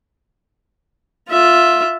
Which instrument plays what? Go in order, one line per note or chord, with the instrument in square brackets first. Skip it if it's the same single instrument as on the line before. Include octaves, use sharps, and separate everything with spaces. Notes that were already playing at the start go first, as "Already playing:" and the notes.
[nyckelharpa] F4 E5